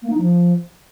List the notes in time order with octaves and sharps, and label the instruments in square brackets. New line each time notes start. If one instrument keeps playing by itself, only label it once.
[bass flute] A#3
D#4
F3